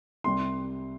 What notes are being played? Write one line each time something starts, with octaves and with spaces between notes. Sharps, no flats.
C2 C3 G3 C6